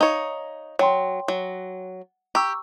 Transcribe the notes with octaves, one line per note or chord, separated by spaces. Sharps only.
D#4 C#5 F5 A#5
F#3 C#5 G5 C6
F#3
G4 A#5 C#6 E6